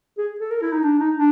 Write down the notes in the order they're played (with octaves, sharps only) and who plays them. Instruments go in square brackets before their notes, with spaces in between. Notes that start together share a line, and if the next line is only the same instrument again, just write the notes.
[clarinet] G#4
A4
A#4
E4
D#4
D4
D#4
D4